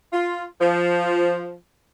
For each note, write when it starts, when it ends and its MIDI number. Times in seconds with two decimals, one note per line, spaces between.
0.13 0.45 65
0.60 1.56 53